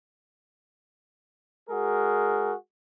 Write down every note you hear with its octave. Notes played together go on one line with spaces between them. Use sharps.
G#3 F#4 G#4 A#4